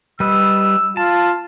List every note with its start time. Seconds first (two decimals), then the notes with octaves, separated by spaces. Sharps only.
0.20 G3 B4 D#5 E6
0.97 F4 A5